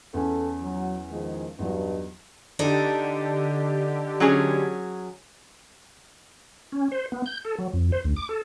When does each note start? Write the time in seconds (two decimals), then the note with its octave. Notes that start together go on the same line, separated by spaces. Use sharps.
0.14 E2 C#4 A4
0.62 F#3
1.10 D#3 F3 G#3
1.59 E2 G2 F#3 D#4
2.59 D3 D4 D#4 G4 A4
4.20 F#3 C#4 G#4
6.72 C#4
6.91 C5
7.12 B3
7.26 G6
7.45 A4
7.58 F#3
7.73 F2
7.92 C5
8.04 D2
8.16 D6
8.29 A4